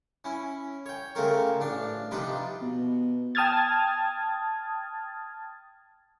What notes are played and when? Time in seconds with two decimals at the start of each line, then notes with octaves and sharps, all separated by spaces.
0.25 C#4 E4
0.86 C#5 G5
1.15 C#3 A3 A#3 C4 A#4 C#6
1.60 A1 D4 F5
2.11 C3 F3 D4 D#4 F4 B4
2.61 B2
3.35 G5 A5 D#6 F6 G#6 A6